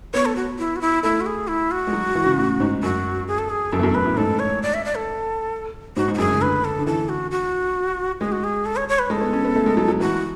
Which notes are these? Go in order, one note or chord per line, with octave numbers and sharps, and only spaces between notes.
B3 C#5
A4
F#4
E4
F#4
E4
A3 E4
F#4
G#4
E4
F#4
G#3
F#3
E3
C#3
A2
G#2
F#2 F#4
G#4
A4
G#4
F#2 A4
E2
F#2
F#2 B4
A2
G#2 A4
C#5
D5
E5
D5
A4
G#2 F#4
G#2
F#4
F#2 G#4
C#3
D3 B4
A4
D3
E3 A4
F#4
F#4
G#3 G#4
F#4
G#4
A4
C#5
C#5
B4
G#3 A4
B3
C#4
B3
A3
G#3
F#3
F#3
E3 F#4